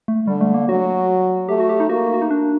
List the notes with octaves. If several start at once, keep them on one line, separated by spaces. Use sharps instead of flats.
A3
D3 G3
A3
A#3
F#3 F#4
A3 G4
F#4
G4
D#4
A#3 F#4
F#4
D#4
D4